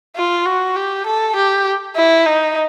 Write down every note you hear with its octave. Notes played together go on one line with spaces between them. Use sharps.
F4
F#4
G4
A4
G4
E4
D#4